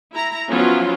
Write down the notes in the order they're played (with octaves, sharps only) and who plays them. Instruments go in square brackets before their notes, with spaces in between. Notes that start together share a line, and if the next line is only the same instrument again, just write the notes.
[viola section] E4 A#5
F3 F#3 B3 C#4 E4 F4